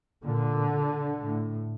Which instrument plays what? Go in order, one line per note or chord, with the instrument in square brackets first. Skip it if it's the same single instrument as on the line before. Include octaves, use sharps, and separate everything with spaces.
[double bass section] A#2 D3
A2